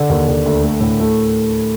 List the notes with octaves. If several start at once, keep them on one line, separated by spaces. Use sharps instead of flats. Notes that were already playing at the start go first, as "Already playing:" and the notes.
Already playing: D3
D#2
D3
D2
A3
A2
A3